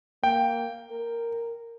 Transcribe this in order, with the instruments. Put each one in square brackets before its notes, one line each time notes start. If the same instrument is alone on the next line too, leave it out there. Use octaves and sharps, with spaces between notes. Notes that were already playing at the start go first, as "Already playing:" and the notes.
[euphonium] A#3 [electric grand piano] G5
[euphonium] A#4